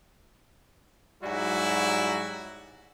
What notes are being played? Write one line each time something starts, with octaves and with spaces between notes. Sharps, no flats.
G#2 F#3 G3 E4 F#4